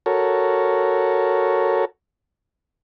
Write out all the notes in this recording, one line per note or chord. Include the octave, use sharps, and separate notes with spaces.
F#4 A4 A#4 C#5